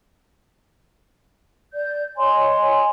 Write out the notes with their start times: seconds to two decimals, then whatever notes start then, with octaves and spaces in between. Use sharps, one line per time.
1.73 D5 G6
2.17 C#5 D#5 G#5 C6